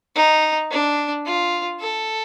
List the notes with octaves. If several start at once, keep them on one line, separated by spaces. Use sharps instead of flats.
D#4
D4
F4
A4